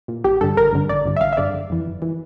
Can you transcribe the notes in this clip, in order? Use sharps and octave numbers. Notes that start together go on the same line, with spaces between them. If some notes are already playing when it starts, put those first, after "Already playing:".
A#2
A1 G4
G2 D3 A4
A1 A#4
G2 D3
A1 D5
G2 D3
E5
A1 F5
E5
G2 D3 D5
G1
F2 E3
G1
E3